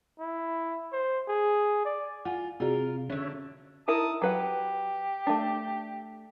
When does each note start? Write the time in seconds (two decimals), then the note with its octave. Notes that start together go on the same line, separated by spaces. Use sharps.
0.19 E4
0.92 C5
1.28 G#4
1.85 D5
2.25 F4 F#5 G#5
2.60 C3 F4 F#4 G#4 A#4 D5
3.10 D3 C#4 D4 C#5 E5
3.88 D#4 E4 A#4 A5 D#6
4.22 F#3 G4 B4 F#5
5.27 A3 D4